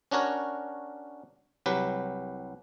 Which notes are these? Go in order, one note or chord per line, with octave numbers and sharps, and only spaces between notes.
C#4 D4 F#4 A#4 C#5
C2 F#3 G4 B4